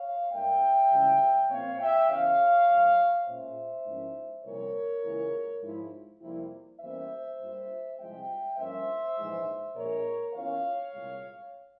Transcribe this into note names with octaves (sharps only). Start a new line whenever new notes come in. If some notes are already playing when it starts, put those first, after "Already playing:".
Already playing: C#5 F5
G#2 G3 A#3 E5 G5
C#2 C#3 E3 G3
A#2 F3 C4 C#5 F5
E5 G5
E2 C#3 E3 C#5 F5
C2 A#2 G3
A#2 G#3 C#4 F4 C5 E5
G#2 F3 A#3 C#4 E4
C2 A#2 F3 C4 A#4 C#5
C#2 C#3 E3 A#3 E4
G#2 F3 G#3 E4
F2 C3 G3 A#3 E4
E2 E3 G3 A#3 C#4 C5 E5
G2 G3 A#3 F4
C2 C3 F3 G#3 C4 E5 G5
G2 F3 A#3 C#4 C5 E5
A#1 G#2 E3 G#3
A#1 A#2 G#3 A#4 C#5
E2 E3 A#3 C#4 F4 C#5 F5
C2 A#2 G#3